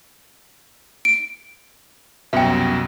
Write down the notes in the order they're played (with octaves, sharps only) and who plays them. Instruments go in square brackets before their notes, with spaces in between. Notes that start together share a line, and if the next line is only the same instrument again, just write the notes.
[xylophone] D7
[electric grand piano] C2 F#2 B2 [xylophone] E5 G5